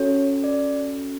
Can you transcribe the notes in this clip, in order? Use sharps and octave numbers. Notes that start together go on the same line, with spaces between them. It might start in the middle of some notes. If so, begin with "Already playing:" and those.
Already playing: C#4 F#4 A4 C#5
D5